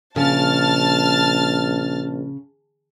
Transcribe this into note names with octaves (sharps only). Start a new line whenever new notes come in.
A#1 C#3 A5 F6 A6